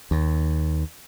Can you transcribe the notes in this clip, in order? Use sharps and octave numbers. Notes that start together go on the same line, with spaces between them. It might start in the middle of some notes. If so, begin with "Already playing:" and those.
D#2